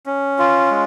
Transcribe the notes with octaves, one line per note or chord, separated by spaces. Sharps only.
C#4
F4
G#3